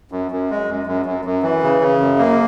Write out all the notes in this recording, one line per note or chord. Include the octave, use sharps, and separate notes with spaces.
F#2
F#2
G#3
F#2
F#2
F#2
F#2
E3
C#3
C#3
F#2
A#3